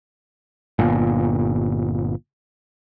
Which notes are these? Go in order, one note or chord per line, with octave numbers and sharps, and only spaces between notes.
G1 A#2